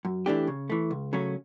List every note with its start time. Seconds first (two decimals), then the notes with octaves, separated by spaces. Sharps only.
0.05 F#2
0.26 E3 A3 D4 G4
0.47 C#3
0.70 E3 A3
0.91 C#2
1.13 C#3 F#3 A3 C#4